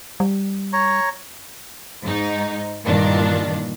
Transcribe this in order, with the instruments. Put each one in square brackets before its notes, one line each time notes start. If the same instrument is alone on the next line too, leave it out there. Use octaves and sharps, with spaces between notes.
[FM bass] G3
[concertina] C#5 A#5 C#6
[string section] G#2 D#4
G2 A#2 D#3 E3 D4